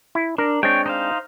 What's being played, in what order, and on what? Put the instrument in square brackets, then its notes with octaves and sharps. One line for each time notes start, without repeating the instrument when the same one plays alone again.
[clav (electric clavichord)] E4
[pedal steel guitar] D4 [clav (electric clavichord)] A#4
[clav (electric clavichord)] G#3 C4 D4 [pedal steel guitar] C#5 G5
[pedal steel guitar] D#4 C5 F5